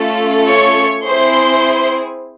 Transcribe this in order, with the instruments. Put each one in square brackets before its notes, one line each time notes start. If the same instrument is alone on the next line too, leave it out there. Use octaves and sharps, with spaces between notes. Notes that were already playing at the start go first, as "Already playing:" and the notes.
Already playing: [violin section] A3 C#4 F4 A4
C#5 C#6
C4 E4 G#4 C5 C6